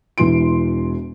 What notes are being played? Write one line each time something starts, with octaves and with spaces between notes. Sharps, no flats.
E1 E3 C6 D7